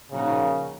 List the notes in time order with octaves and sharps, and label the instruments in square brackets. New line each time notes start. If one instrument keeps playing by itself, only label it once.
[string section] A#2 F3 A#3 D#4 F#4 [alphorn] C#3